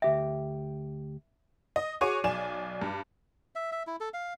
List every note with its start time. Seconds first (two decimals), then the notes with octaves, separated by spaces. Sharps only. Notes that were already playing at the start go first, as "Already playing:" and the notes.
0.02 D2 G4 E5 G5
1.76 D#5
2.01 F#4 G#4 C#5 C#6 D6 D#7
2.24 B1 D5 G#5 E7
2.82 G2
3.55 E5
3.72 E5
3.87 E4
4.00 A4
4.14 F5